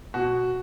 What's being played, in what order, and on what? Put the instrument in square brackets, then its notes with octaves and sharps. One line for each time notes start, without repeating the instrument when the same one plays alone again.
[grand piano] B2 F#4